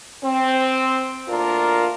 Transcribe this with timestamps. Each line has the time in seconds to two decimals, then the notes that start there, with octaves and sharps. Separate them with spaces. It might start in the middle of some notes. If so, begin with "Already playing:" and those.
0.24 C4
1.29 D2 A#3 D4 F4 A#4